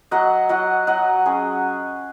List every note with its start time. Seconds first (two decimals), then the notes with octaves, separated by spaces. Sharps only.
0.11 F#3 D#5 F#5
0.49 F#3 D#5 F#5
0.87 F#3 D#5 F#5
1.26 C#4 G#4